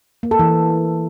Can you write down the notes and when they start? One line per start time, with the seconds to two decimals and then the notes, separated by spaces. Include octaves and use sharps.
0.23 A#3
0.31 A4
0.39 E3